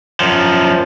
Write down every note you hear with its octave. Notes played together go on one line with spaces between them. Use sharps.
F#2 F3